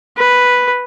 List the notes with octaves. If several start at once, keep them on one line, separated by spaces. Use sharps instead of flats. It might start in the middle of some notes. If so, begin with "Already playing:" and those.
B4